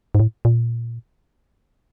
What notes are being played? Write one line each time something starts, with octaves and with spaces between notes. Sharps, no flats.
G#2
A2
A#2